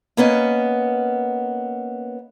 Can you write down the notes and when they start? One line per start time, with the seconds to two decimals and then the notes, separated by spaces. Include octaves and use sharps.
0.17 A#3 B3 C#4 D#5